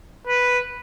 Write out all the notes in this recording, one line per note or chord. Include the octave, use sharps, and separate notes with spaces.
B4